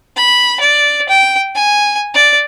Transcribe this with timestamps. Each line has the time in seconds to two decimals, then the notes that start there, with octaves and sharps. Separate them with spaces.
0.17 B5
0.60 D5
1.09 G5
1.55 G#5
2.14 D5